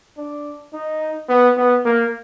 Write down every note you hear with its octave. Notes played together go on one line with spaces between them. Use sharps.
D4
D#4
B3
B3
A#3